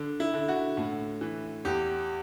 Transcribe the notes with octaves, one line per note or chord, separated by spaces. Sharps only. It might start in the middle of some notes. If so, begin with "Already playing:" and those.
Already playing: D3
E4
D3
F#4
A2
E3
E2 G4